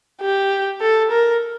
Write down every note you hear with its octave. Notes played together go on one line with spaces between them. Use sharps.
G4
A4
A#4